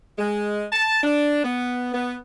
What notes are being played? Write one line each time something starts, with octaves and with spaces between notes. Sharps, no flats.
G#3
A5
D4
B3
B3